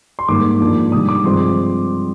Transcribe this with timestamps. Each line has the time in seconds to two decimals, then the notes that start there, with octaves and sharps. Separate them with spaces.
0.19 C6
0.28 G#2 D#3 G3 A#3 D6
0.61 G#2 F3 A#3 D4
0.92 C3 D#3 G3 D#6
1.09 D6
1.24 G2 F3 G#3 C4 C6